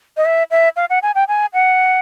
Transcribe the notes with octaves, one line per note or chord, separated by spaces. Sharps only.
D#5
E5
E5
F5
F#5
G#5
G5
G#5
F#5